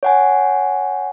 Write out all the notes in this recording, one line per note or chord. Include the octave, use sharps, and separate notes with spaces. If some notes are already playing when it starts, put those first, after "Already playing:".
C#5 F#5 G#5